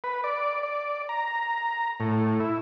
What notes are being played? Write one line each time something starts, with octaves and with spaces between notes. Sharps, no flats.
B4
D5
D5
A#5
A2
E4